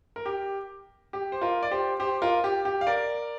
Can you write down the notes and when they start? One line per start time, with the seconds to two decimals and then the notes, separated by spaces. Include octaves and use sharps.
0.16 A#4
0.26 G4
1.13 G4
1.32 C5
1.42 F4 A#4
1.63 D5
1.71 G4 C5
2.00 G4 C5
2.22 F4 A#4
2.44 G4
2.65 G4
2.81 F5
2.87 A#4 D5